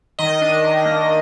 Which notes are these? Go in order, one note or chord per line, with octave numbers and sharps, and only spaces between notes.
D#3 D#5
D4
D#3
A#3